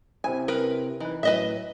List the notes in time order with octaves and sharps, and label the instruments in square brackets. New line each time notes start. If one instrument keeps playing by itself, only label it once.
[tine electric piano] C3 C4 E4 [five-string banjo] G#5
[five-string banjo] A#4 B4
[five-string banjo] E3 [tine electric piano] D#4 B4
[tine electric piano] A2 F#3 [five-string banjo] B4 D#5 E5